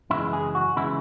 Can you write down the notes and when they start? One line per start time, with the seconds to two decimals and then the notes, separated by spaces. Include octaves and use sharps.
0.10 F#2 C#3 E3 G#3 E4
0.33 G#4
0.55 F#4
0.76 C#3 E3 G#3 E4